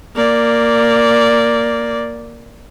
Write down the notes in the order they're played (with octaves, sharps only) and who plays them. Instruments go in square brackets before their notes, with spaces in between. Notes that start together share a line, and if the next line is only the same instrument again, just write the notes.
[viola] A#3 D5